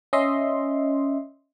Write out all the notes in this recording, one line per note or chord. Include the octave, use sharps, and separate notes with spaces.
C#4 D#5 E5 C6